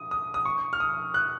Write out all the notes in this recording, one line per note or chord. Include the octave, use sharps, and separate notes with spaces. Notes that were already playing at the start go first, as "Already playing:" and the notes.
Already playing: D#6
D#6
D#6
C#6
F6
D#6
F#6